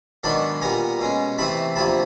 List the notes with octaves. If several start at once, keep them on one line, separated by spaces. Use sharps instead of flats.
G#2 D#3 F#3 B3 D4 A5 B5
A#2 G3 B3 G#5 A#5
B2 G#3 C#4
C3 E3 A3 C4 A5 B5
D2 C3 F3 A#3 A5 B5